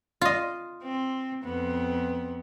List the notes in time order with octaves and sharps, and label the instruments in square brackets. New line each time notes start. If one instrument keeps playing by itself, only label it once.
[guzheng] F4 D#5
[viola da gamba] C4
F2 B3